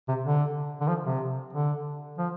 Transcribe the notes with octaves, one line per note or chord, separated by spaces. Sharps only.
C3
D3
D3
F3
C3
D3
F3